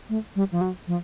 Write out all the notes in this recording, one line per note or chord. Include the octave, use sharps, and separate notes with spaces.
A3
G3
F3
F#3
F3